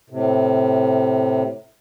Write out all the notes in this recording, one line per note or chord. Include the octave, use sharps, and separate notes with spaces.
A2 C3